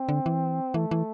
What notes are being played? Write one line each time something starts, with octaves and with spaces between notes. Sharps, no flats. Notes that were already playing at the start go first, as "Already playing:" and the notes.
Already playing: C4
D3
E3
E3 A3
E3